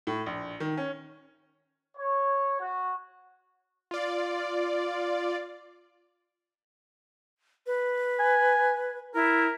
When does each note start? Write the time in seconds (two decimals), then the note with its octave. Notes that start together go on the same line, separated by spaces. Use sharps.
0.07 A2
0.26 A#1
0.60 D#3
0.77 C#4
1.97 C#5
2.60 F#4
3.91 F4 D5
7.67 B4
8.20 G#5
9.15 E4 A#4